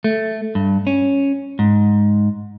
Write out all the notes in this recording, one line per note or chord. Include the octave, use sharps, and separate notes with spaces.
A3
G2
C#4
G#2